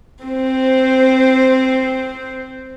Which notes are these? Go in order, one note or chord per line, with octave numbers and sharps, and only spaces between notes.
C4 C5